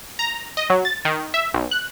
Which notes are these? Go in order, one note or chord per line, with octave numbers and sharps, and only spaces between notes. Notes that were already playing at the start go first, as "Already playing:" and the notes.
A#5
D#5
F#3
A6
D#3
E5
B1
F#6